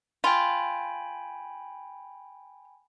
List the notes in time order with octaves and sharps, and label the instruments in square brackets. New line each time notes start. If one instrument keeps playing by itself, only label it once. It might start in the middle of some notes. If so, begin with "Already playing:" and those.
[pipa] F4 [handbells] G5 G#5 B5